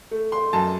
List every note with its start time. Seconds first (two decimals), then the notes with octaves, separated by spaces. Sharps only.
0.11 A3
0.32 C6
0.53 F#2 A5